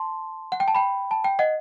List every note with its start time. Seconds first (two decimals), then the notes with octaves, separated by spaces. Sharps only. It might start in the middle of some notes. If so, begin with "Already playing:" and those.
Already playing: A5 C6
0.52 F#5
0.60 G5
0.68 A5
0.75 G5 B5
1.11 A5
1.24 G5
1.39 D#5 F#5